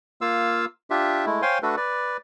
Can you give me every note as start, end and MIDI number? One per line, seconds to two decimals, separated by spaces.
0.21 0.65 58
0.21 0.65 65
0.21 0.65 77
0.21 0.65 88
0.90 1.25 62
0.90 1.25 65
0.90 1.25 67
0.90 1.25 76
1.26 1.42 56
1.26 1.42 57
1.26 1.42 64
1.42 1.59 72
1.42 1.59 73
1.42 1.59 77
1.42 1.59 79
1.42 1.59 80
1.42 1.59 84
1.63 1.76 57
1.63 1.76 62
1.63 1.76 66
1.63 1.76 69
1.63 1.76 71
1.77 2.17 71
1.77 2.17 74